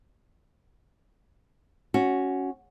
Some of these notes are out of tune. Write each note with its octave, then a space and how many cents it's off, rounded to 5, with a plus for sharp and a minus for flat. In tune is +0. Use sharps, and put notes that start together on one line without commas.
C#4 +0 F#4 +0